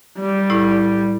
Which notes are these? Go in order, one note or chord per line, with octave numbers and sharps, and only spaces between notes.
G3
A2 E4